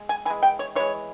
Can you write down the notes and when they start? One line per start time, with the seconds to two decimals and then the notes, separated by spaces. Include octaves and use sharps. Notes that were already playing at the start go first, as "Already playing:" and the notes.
Already playing: G#3
0.09 G#5
0.25 E3 G#5
0.30 G#3
0.43 G5
0.59 C#5
0.75 E3 G#3 C#5